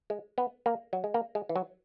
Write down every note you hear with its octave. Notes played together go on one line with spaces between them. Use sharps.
G#3
B3
A#3
F#3
G#3
A#3
G#3
E3
F#3